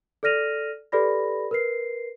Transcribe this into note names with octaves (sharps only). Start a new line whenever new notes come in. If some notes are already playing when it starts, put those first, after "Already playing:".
A4 D5 F6 A#6 D#7 F7
G4 A4 B4 D5 B5 A#6
A#4 B4 C7